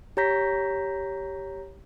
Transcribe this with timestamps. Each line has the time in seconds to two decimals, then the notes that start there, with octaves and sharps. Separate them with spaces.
0.17 G4 C#5 A#5 G6 A#6 B6